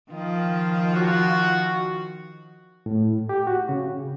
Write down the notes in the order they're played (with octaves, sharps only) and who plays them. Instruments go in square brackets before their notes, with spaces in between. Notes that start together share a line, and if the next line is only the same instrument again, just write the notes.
[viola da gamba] D#3 F3 F4
[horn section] F#4
[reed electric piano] A2
G4
F#4
C#3